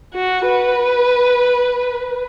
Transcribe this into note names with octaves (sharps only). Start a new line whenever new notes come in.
F#4
B4